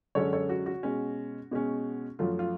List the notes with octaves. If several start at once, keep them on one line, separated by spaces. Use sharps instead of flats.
F#2 D3 G#3 C#4 A4 C#5
A4 C#5
F#4
F#4
B2 G#3 C#4
B2 G#3 C#4
F#2 F3 A3 F4
F4